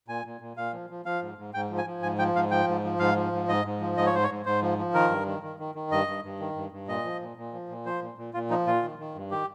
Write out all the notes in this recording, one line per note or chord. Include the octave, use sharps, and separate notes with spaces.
A#2 G#5
A#2
A#2
A#2 F5
F3
F3
F3 F5
G#2
G#2
G#2 G5
F3
G#5
F3
G#2 G#5
F3 G5
G#2 F5
F3 G5
G#2
F3
G#2 F5
F3
G#2
G#2 D#5
G#2
F3
G#2 D#5
C#5
G#2 C5
C#5
G#2
G#2 C5
F3
F3
D#3 A#4
G2
D#3
D#3
D#3
D#3
G2 D#5
G2
G2
D#3
G2
G2
A#2 D#5
F3
A#2
A#2
F3
A#2
F3 C5
A#2
A#2
A#2 F4
F3 D#4
A#2 F4
D#3
D#3
G2
D#3 G4